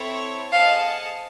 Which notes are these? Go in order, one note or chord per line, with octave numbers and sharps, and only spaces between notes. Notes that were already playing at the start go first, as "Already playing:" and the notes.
Already playing: C4 E4 A4 C#5
G#4 C5 D#5 F5 F#5 A5